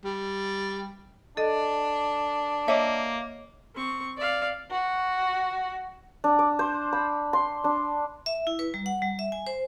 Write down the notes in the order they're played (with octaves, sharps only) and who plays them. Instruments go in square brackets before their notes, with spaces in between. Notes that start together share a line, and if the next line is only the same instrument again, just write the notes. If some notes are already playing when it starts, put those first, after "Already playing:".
[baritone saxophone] G3
[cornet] D4 [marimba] A4 D#5
[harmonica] A#3 [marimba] C#5 D#5 [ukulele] E5
[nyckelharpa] C4 C#6
D5 F5
[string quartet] F#4
[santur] D4
D5
C5
B5
C6
D4
[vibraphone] E5
E4
B4
G3
F#5
G3
E5
G#5
C5